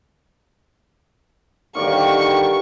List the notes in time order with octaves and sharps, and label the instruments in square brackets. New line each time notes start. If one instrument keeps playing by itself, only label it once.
[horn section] G2 D3 D#3 [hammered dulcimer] G4 D5 F5 [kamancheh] C#6